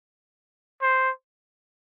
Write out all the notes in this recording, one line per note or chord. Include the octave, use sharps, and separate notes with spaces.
C5